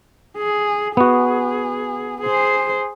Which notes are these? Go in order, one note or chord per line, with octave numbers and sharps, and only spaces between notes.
G#4
B3 F#4 G#4
G#4 C5